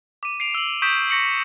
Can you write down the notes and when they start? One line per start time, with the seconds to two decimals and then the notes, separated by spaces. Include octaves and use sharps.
0.23 D6 D#7
0.40 C7 D7 F7
0.55 E6 F#7
0.82 C#6 D#6 G6 B6 D7 E7
1.10 C#6 A#6 C#7 F#7